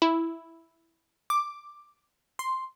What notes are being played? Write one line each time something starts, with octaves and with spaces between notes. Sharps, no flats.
E4
D6
C6